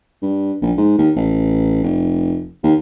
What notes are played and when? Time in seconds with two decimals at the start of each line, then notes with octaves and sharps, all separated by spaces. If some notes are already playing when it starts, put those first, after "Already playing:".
0.22 G2
0.62 A#1
0.78 G#2
0.98 D#2
1.16 A1
1.83 F1
2.64 D#2